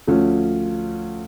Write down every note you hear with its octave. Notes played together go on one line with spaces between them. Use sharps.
D2 F3 C#4